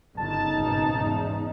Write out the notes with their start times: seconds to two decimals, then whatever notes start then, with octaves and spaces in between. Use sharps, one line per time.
0.17 G1 C#3 D#4 A5
0.58 G#1 B2
0.93 E2 G#2